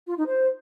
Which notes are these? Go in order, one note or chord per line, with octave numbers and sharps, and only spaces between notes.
F4
D#4
C5